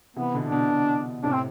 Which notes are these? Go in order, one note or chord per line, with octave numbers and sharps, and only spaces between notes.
C3 E3 B3
B2 D3
D4
B2 D3
B2
A2 C3 D4
C4